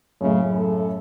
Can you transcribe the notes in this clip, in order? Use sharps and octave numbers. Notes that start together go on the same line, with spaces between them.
F#2 A2 C#3
A4